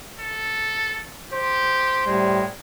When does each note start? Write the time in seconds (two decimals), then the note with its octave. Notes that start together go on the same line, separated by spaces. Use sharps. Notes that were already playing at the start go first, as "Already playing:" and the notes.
0.20 A4
1.33 G4 C5
2.07 A2 G3 G#3